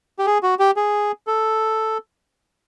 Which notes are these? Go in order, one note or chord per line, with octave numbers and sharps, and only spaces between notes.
G4
G#4
F#4
G4
G#4
A4